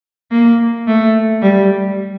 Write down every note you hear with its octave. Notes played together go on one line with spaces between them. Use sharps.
A#3
A3
G3